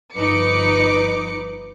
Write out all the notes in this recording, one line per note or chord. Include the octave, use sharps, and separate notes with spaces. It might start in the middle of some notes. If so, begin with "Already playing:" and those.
G1 F3 D#4 B4 D6 C#7